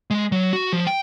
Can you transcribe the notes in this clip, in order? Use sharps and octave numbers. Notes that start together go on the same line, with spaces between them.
G#3
F#3
F#4
F3
G5